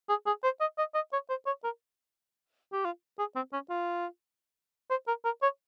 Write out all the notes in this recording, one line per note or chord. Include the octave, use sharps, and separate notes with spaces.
G#4
G#4
C5
D#5
D#5
D#5
C#5
C5
C#5
A#4
G4
F4
G#4
C4
C#4
F4
C5
A#4
A#4
C#5